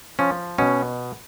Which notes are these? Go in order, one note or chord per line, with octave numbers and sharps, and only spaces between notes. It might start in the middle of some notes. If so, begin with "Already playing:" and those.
F3 C#4
B2 C#4